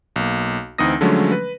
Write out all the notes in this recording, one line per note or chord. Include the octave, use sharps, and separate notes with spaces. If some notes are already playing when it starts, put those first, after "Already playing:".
B1 A#3
D2 E3 C4 D#4 D#6 A#6
D3 F3 F#3 G#3 A3 C#4
B4